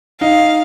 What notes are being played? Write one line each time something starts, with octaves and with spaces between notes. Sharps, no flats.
D#4 F5